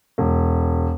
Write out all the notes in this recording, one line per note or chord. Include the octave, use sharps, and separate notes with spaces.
E1